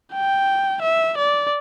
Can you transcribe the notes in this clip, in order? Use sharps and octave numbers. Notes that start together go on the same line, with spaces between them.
G5
E5
D5